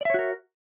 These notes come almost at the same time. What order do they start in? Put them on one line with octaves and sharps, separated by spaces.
D5 E5 C#5 F#4 A#4